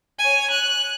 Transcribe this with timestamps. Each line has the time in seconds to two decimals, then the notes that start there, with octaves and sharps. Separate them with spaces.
0.19 C#5 G#5
0.50 F#6